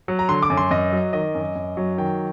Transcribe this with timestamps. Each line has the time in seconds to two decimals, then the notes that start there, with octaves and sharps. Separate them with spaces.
0.08 F#3
0.19 A#5
0.29 D3 C6
0.42 D6
0.50 F#2
0.57 C6
0.71 F#2 D#5
0.92 F#3
1.13 D#3 D#5
1.35 F#2
1.56 F#2
1.77 F#3
1.98 D#3 G5